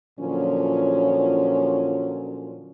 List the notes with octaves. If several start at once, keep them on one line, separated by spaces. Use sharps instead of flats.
A#2 D3 F3 F#3 C#4